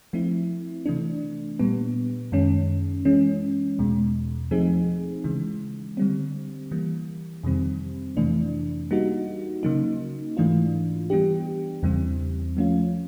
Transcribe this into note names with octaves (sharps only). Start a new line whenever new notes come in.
F3 A3 C4 E4
C3 E3 A3 D4
A#2 G3 B3
F#2 D#3 G#3 C#4
E3 G#3 C#4
E2 B2 G#3
F3 A3 C4 D#4 G#4
C#3 E3 G#3
D3 G3 C4
E3 G3 A#3
F2 C3 D#3 G3 C4
F2 C3 E3 A3 D4
G3 A#3 D#4 F#4
C#3 F#3 A#3 D#4
G#2 E3 A3 D4 F4
E3 G3 B3 D4 G4
E2 C#3 E3 G3 C4
F3 A3 C#4 F4